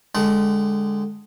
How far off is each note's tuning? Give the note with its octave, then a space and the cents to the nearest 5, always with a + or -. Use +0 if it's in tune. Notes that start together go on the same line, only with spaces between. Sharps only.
D3 +0 G#3 -5 G5 -40